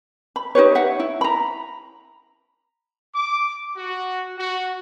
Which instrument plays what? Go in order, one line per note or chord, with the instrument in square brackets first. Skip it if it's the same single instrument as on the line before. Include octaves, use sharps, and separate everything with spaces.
[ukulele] B5
D#4 G4 B4 C#5
E5 F#5
E4
A#5 B5
[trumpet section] D6
F#4
F#4